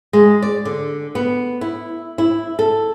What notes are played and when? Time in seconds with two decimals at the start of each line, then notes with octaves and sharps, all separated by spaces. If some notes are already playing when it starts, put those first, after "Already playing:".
0.13 G#3
0.42 D5
0.65 D3
1.15 B3
1.61 E4
2.18 E4
2.59 A4